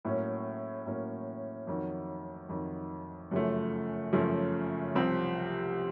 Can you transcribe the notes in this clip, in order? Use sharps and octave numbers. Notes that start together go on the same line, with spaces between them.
A2 F#3 A#3 C#4
A2 F#3 A#3 C#4
F2 D#3 F#3
F2 D#3 F#3
F#2 C#3 F3 A3
F#2 C#3 F3 A3
C2 C3 F3 C4